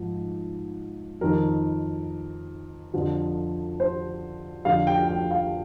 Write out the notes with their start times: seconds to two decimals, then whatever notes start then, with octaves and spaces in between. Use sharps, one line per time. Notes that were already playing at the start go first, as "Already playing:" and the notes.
Already playing: G#2 F3
1.21 F2 D#3 A#4
2.94 F2 D3 F3
3.80 C5
4.65 F2 D3 F3 F5
4.87 G5
5.08 G5
5.31 F5